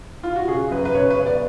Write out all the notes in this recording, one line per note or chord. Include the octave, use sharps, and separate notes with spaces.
F4
F#4
C#3 G#4
F#2 B4
B4
C#3 C#5
B4
B3
D5